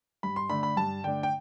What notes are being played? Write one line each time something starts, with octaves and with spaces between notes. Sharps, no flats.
G2 B5
C6
D3 A3 D4 B5
B5
G2 A5
D3 A3 D4 G5
G5